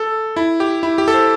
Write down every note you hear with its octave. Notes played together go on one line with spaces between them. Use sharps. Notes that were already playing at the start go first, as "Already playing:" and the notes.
Already playing: A4
E4
G4
E4
G4
A4
C5